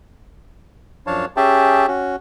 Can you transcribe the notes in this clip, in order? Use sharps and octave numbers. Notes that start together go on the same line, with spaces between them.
F#2 F3 D4 C#5 F5 A5
C#4 G4 G#4 E5 G5 A5
C#4 F#4